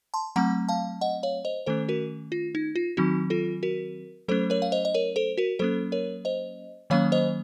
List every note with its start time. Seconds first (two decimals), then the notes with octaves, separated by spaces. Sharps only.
0.14 A5 C6
0.36 F#3 A3 C4 F#5 A#5
0.68 F5 A5
1.01 D#5 F#5
1.23 C#5 F5
1.45 C5 D#5
1.66 D#3 A3 C#4 A4 C5
1.89 F#4 A#4
2.32 F4
2.55 D#4
2.76 F4
2.97 D#3 F#3 C4 D#4 F#4
3.30 F4 A4
3.63 F#4 A#4
4.28 F#3 A3 C#4 A4 C5
4.50 A#4 C#5
4.62 F5
4.72 C5 D#5
4.85 D#5
4.94 A#4 C#5
5.16 A4 C5
5.38 F#4 A#4
5.59 F#3 A#3 C#4 A4 C5
5.92 A#4 C#5
6.25 C5 D#5
6.90 D#3 F#3 A#3 C#4 C#5 F5
7.12 C5 D#5